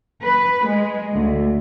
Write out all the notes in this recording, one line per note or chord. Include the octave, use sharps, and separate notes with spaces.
B4
G#3
D2